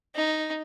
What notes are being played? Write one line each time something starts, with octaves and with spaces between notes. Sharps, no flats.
D#4